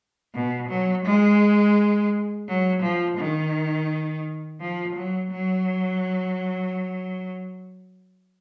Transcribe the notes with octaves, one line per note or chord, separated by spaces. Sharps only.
B2
F#3
G#3
F#3
F3
D#3
F3
F#3
F#3